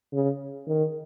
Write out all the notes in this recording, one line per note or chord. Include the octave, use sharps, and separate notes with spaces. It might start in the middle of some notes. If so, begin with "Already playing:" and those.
C#3
D#3